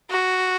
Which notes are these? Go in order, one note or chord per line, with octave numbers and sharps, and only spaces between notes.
F#4